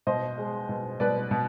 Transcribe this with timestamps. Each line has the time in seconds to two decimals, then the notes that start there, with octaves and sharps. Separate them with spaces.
0.07 B2 C5 D#5
0.38 G#3
0.69 B2
1.00 B2 B4 D5
1.31 B2